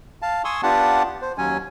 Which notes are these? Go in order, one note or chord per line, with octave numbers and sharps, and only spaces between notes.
F5 A5
G#5 C6 C#6 D#6 E6
B3 D4 F4 G4 F#5 A5
C5
D#2 F#3 C#4 G#5